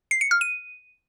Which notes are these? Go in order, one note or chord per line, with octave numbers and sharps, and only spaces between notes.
C7
C#7
F6
D#7